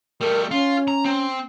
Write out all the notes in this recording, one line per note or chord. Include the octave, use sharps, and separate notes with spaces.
G3 A3 A#4
C#4 F4
A#5
C4